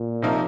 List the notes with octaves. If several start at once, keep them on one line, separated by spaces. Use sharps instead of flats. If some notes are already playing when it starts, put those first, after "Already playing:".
Already playing: A#2
C3 F3 A#3 D#4 A#4